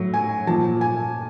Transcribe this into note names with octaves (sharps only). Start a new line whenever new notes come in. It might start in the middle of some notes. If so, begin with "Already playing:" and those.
Already playing: A2 F#3
G#5
A#2 F3 A5
G#5